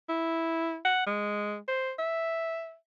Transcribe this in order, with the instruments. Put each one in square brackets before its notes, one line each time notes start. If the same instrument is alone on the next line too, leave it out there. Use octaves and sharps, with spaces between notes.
[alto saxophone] E4
F#5
G#3
C5
E5